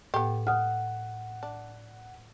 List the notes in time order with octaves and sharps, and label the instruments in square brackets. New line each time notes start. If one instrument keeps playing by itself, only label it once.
[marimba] A2 [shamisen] B3 G4
[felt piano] F#5 [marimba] D#6 F6
[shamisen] D4